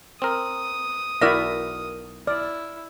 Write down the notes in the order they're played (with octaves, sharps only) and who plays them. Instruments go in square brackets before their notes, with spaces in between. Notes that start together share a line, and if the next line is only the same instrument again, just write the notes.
[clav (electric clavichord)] C4 A#4 [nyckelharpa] D#6
[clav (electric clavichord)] B1 F#4 [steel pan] E4 D5 E5 [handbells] A#4 F6 A#6
[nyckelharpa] E4 [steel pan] D5 [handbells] F6